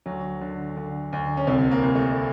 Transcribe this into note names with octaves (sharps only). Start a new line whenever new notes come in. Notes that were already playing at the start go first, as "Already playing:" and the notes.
D2 F#3
D3
D3
D2
C#4
C2 C4
A#3
C2
A3